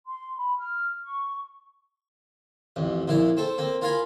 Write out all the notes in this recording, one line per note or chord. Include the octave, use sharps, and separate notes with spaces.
C6
B5
F6
C#6
A1 F2
F2 A#2 E4 F5
C4 A4
A#3 C4
F4 A#4 F5 G#5 B5